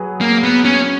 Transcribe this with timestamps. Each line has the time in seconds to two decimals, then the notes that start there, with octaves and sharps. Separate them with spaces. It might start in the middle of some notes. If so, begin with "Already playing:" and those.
Already playing: F#3 G#4 B4
0.21 A#3
0.43 B3
0.65 C#4